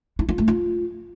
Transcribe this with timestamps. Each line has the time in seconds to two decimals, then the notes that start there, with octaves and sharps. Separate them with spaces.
0.19 E4
0.29 F4
0.38 A3
0.48 F4